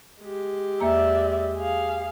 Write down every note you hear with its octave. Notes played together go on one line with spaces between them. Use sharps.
G#3 G4
E2 A#3 D5 E5 A#5
G#4 F5